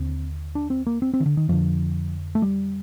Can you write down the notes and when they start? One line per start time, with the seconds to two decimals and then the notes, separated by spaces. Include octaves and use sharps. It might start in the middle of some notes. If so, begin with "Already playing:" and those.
Already playing: D#2 D3 C4
0.55 D4
0.70 C4
0.87 A#3
1.02 C4
1.14 C4
1.20 D#3
1.26 D3
1.37 D#3
1.49 F2 D3 F3
2.35 A3
2.42 G3